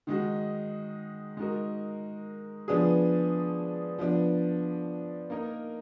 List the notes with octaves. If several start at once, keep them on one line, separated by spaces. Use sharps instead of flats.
D#3 G#3 D#4 F#4
G#3 D#4 F#4 A#4
F3 B3 D4 G#4
F3 B3 D4
A#3 D#4 A#4